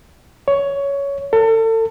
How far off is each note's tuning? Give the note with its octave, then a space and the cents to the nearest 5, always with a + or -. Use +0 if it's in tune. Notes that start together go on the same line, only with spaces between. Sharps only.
C#5 +15
A4 +35